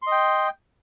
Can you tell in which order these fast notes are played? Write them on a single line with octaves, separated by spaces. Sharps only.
C6 D#5 G5